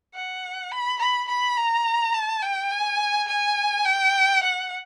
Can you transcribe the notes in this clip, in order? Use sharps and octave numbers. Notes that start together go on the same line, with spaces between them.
F#5
B5
B5
B5
A#5
A5
G5
G#5
G#5
G5
F#5